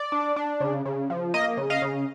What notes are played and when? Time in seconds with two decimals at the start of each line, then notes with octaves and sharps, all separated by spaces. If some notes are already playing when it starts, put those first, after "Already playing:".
Already playing: D5
0.12 D4
0.36 D4
0.60 C#3
0.85 C#3
1.10 F3
1.34 A#3 D#5
1.57 C#3
1.70 D#5 F5
1.82 C#3